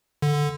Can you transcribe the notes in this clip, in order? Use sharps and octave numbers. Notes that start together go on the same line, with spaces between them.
D3